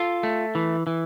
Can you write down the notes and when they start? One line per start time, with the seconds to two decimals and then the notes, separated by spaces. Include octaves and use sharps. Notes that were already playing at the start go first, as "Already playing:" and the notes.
Already playing: F4 A4
0.23 A3
0.55 E3
0.87 E3